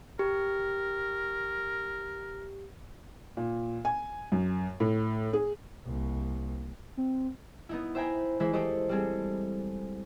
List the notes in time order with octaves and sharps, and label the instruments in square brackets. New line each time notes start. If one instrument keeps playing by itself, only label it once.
[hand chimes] G4 [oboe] A#4
[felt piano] A#2
G#5
F#2
A2
G#4
[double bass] C2 A#3
[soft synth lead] C4
[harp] B3 D#4 E4
C5 E5 G5 G#5 A#5 B5
E3 G#3 E4 C5 B6
E4 G4 A4 C5 D#5
G3 G#3 C4 G#4 A4